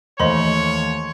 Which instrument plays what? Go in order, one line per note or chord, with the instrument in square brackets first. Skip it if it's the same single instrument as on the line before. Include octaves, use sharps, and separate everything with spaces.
[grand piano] D#2 A3 [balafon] E3 C5 D#5 [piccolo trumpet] C#5 [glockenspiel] C6